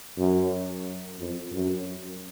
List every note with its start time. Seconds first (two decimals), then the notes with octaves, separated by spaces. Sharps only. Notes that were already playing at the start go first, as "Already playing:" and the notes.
0.18 F#2
1.19 F2
1.52 F#2